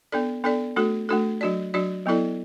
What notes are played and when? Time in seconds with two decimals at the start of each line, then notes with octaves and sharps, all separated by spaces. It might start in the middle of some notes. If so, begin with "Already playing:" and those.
0.12 B3 D4 A4 D5
0.44 B3 D4 A4 D5
0.76 A3 D4 F#4 A4
1.09 A3 D4 F#4 A4
1.41 F#3 D4 F#4 D5
1.74 F#3 D4 F#4 D5
2.06 F#3 B3 E4 A4 D5